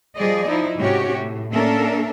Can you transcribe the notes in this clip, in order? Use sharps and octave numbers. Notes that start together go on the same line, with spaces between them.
F3 G3 G#4 D5 D#5
F3 D#4 E4
G#2 C3 C#4 F#4 G4 C#5
A2
A#3 C#4 D4 A4 A#4 E5